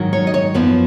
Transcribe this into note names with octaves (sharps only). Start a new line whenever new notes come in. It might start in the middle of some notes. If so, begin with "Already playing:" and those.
Already playing: G#2 D#3 F#3
C#5
D#5
C#5
F#2 F3 B3